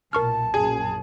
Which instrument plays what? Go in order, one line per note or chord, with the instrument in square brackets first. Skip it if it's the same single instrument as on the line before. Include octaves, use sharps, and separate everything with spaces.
[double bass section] B1 A#2 [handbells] A#4 C#6 F6 [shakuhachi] A5
[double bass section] A#1 F#2 [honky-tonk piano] G#4